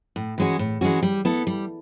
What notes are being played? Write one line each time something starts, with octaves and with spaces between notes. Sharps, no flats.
A2
E3 G#3 C#4 F#4
A2
E3 G#3 C#4 F#4
G3
B3 E4 A4
G3